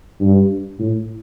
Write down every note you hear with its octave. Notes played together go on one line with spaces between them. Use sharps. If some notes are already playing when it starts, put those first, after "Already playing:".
G2
A2